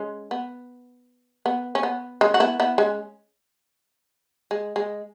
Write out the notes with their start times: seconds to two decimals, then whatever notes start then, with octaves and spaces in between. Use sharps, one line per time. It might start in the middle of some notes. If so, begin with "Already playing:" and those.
Already playing: G#3 C#4
0.31 B3
1.46 B3
1.75 C#4
1.83 B3
2.21 G#3 C#4
2.34 F#4
2.40 B3 E4
2.60 B3 E4
2.78 G#3 C#4
4.51 G#3
4.76 G#3